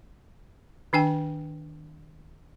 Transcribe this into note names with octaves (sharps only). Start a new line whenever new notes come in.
D#3 D4 G5 G#5